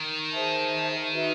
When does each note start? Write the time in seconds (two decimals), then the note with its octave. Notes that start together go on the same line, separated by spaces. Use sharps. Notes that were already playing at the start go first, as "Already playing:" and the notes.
Already playing: D#3
0.31 G#4 C5 E5 A5
1.11 D#4 F#4 B4 E5